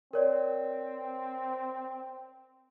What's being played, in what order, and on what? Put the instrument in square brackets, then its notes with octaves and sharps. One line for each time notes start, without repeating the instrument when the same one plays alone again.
[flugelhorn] C4 [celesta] A#4 C#5 D5